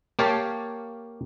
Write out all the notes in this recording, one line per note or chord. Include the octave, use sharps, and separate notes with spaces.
A#3 G4 C#5 F5 A5